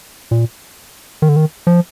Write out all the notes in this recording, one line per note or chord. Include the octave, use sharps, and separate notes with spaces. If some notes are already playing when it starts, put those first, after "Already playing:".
A#2
D#3
D3
D#3
F3